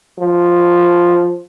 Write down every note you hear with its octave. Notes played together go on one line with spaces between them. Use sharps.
F3